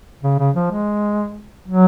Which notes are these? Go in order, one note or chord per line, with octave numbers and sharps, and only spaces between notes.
C#3
C#3
F3
G#3
F#3